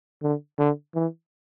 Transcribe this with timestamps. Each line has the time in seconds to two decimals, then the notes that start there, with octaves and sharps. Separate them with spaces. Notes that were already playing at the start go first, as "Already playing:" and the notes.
0.23 D3
0.59 D3
0.95 E3